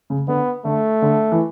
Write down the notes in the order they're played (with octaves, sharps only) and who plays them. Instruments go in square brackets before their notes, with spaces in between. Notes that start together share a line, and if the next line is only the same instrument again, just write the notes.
[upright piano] C#3
[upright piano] D3 [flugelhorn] B3
[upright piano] D3 [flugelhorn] A3
[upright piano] D3
E3